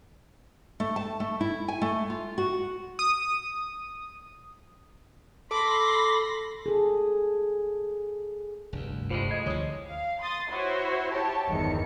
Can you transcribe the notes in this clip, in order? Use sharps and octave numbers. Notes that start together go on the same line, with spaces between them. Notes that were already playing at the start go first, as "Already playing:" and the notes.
A3
A5
A3
E4
G#5
A3
F4
F#4
D#6
A4 B5 C6 D6 A#6
G#4 A4
F1 D2 G2
G1 A2 G3 G#3 F4 C5
D#5 G#6
D2 D3 F3 C#5 D#6
F5
C6 D#6 A6
E4 F#4 C5 C#5
G4 C#5 A5
G1 E2 D#3 E3 C#7